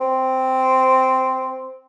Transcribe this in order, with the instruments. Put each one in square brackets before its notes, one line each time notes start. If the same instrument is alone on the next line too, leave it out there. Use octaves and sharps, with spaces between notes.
[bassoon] C4